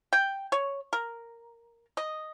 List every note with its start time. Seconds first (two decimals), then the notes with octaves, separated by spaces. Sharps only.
0.13 G5
0.52 C#5
0.93 A#4
1.97 D#5